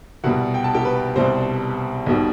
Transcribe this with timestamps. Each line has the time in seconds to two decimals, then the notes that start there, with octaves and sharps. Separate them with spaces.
0.24 C2 B2 G3 F#4 F#5
0.54 G5
0.64 A5
0.75 G4 G5
0.85 B4
1.16 C2 B2 G3 C4 C5
2.06 B1 B2 G3